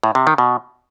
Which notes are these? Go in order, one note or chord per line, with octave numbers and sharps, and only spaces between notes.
A2
C3
D#3
B2